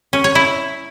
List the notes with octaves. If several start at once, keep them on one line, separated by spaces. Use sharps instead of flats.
C#4
C#5
E4